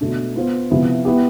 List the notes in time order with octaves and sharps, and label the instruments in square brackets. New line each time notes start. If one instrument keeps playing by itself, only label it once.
[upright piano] B2 A3 D4
B3 F4 C5
C3 F3 B3 E4
B3 E4 G4